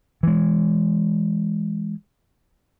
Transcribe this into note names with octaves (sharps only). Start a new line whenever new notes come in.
E3 G#3